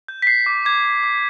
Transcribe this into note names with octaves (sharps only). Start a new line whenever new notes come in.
G6
B6
G6 C7
D6
D6 G#6
D6
D6